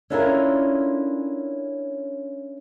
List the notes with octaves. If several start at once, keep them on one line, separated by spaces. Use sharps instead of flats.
C#4 D4 E4 F4 A4 A#4